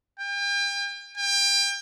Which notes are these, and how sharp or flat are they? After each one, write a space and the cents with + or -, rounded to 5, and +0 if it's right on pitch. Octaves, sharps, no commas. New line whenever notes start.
G5 +40
G5 +30